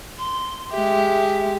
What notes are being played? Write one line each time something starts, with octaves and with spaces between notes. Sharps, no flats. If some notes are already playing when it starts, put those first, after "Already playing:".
C6
G#3 G4 E5